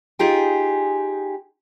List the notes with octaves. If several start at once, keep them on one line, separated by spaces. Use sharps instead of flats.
D#4 F4 G4 G#4 G5 G#5